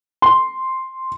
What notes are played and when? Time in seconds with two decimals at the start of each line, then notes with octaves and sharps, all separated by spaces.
0.22 C6